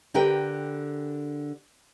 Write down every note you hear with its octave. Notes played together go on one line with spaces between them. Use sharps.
D3 G4 A#4 B4 G5